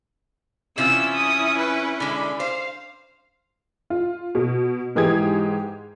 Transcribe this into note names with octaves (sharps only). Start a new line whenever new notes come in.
C3 E3 C#4 E4 F4 E6
D#6
B4
D3 G#3 B5
C5 F5
F4
B2
G#2 E3 G#3 G4 D#6 G#6